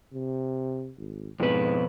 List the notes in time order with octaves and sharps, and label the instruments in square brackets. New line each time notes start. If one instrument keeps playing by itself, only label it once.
[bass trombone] C3
G#1
[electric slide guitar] F2 B2 B4 [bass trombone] G#2